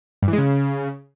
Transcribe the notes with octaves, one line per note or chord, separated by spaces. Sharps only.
G2
E3
G#3
C#3